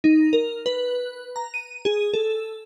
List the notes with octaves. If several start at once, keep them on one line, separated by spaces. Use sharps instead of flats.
D#4
A#4
B4
A#5
D#7
G#4
A4